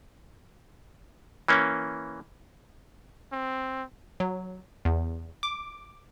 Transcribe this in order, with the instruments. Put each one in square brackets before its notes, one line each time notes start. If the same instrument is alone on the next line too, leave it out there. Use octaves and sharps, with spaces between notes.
[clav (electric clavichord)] E3 A#3 C#4
[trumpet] C4
[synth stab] F#3
E2
D6